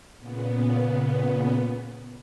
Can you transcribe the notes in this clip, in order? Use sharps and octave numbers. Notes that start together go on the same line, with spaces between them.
A#2 C#3 B3